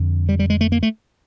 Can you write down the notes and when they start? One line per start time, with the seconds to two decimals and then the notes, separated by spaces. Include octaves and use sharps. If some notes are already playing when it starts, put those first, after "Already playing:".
Already playing: F2 D3
0.29 G3
0.39 G3
0.50 G#3
0.61 A3
0.72 A#3
0.83 A3